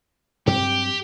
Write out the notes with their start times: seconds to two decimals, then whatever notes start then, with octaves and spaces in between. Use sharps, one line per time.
0.47 G2 F#3 C4 G4